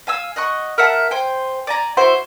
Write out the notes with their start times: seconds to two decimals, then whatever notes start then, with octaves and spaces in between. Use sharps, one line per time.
0.07 F5 G#5 E6
0.36 D#5 F#5 C#6
0.78 A#4 E5 F#5 A5
1.11 C5 G5 G#5
1.67 D5 G#5 A#5
1.97 E4 F#4 C5